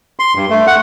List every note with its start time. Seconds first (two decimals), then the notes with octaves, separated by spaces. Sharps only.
0.19 C6
0.36 G2
0.50 A3
0.67 F#5